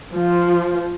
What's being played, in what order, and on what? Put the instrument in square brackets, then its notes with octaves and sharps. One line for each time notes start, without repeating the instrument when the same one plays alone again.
[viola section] F3